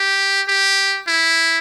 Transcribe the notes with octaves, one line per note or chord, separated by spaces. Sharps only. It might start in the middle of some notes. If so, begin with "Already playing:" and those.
Already playing: G4
G4
E4